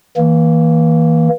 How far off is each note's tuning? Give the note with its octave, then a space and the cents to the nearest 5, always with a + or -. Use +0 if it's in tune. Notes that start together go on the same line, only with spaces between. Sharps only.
E3 -30 A#3 +0